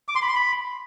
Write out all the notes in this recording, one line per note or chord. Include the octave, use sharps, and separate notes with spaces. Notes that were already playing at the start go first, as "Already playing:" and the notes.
D6
C6
B5
C6
B5